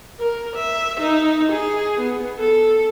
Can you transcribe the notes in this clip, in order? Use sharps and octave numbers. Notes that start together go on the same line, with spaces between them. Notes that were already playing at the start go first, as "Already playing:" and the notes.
A#4
E5
D#4
G#4
B3
A4